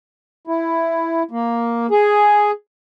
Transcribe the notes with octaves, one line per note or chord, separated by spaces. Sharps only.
E4
A#3
G#4